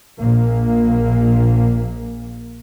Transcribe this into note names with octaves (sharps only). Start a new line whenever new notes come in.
A#1 A#3